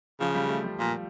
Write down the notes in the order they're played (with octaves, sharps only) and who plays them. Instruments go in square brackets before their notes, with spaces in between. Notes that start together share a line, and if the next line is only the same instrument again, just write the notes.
[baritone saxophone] C#3 [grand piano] F3
[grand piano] G3
A3
G3
[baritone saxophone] A#2 [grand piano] F3